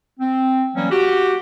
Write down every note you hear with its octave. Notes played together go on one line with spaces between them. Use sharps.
C4
E3 F#3 G3 A#3 C#4
F#4 G4